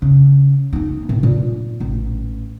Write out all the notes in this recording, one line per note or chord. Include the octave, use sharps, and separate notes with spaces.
C#3
A#3 D#4
A2
A#2
A1